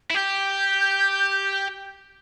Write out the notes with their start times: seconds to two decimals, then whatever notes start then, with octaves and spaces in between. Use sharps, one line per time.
0.10 E4
0.15 G4 G6